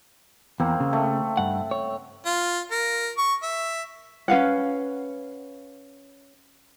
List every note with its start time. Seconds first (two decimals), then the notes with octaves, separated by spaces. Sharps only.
0.60 E2 A#3 C4
0.80 C#3
0.93 A3
1.37 G2 F#5
1.71 C#5
2.26 F4
2.71 A#4
3.18 C#6
3.43 E5
4.28 C#4 B4 F5 F#5